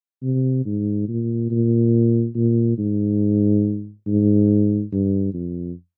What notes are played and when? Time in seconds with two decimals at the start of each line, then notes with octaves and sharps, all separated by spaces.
0.22 C3
0.65 G#2
1.08 A#2
1.50 A#2
2.35 A#2
2.78 G#2
4.06 G#2
4.92 G2
5.34 F2